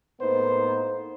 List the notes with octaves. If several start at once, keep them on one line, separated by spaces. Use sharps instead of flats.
A2 A#3 B3 D#4 C5